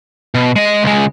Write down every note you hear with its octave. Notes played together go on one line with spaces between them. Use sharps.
B2
G#3 D#5
C#2 G#3